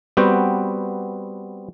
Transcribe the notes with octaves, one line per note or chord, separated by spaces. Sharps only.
G3 B3 C4 F#4 G5